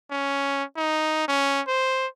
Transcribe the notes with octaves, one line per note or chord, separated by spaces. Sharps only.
C#4
D#4
C#4
C5